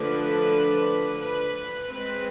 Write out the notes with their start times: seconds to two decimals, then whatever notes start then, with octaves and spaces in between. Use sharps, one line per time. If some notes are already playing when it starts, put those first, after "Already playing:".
Already playing: D3 F3 A3 D4 B4
1.18 B4
1.89 G#3 C4 B4